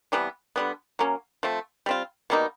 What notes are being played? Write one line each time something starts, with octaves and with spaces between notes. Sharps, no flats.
C3 E3 G3 B3
D3 G3 B3
F#3 A#3 C#4
F3 A3 C4
G3 C4 F4
B2 G3 A#3 D#4